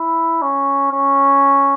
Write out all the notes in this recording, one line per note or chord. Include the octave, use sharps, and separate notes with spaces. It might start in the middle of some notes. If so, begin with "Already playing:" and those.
Already playing: E4
C#4
C#4